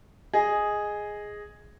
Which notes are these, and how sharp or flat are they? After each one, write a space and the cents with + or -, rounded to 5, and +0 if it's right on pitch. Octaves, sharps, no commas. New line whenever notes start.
G#4 +0 D#5 +0